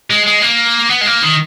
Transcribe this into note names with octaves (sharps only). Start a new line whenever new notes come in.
G#3
G#3
A#3
B3
G#3
A#3
D#3